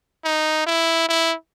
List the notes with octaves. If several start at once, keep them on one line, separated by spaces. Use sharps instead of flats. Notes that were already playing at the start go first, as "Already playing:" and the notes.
D#4
E4
E4